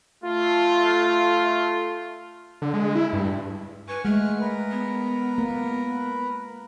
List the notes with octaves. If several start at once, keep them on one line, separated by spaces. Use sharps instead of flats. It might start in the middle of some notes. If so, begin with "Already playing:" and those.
A3 F4
D3
G#3
E4
G2
B4 G#5 C#6
G#3 A3 F#5 F6
A#4 B4
B3
A#3